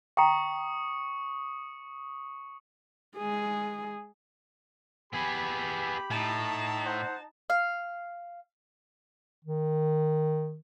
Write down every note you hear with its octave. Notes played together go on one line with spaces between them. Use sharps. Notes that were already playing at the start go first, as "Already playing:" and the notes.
G5 A#5 C#6 D#6 C#7
G#3 G#4
B3 G4 G#4 B5
A2 D#4 A5
C5 F#5
F5
D#3